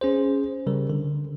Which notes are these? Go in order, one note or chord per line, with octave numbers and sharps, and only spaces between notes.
C#4 G#4 C5
C#3 G3 A#4
D3